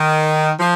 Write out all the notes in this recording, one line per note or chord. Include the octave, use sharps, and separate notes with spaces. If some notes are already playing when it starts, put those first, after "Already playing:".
Already playing: D#3
F3